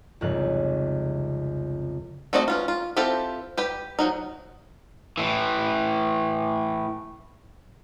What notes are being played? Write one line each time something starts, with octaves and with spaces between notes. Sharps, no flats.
C2 F2 G#2 C#3 F#6
A3 C4 F#4 D5 D#5
E3 C#4 F4
F4
C4 E4 F4 G4 A4
G4 B4 G5
F3 F#3 D#4
A2 E3